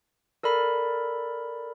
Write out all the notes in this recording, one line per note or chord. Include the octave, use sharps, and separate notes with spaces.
A4 A#4 D5 B5